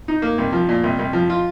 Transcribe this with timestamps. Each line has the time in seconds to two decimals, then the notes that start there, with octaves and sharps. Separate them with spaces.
0.08 D#4
0.22 A#3
0.38 C2
0.53 F3
0.69 A#2
0.84 C2
0.99 C2
1.13 F3
1.30 F4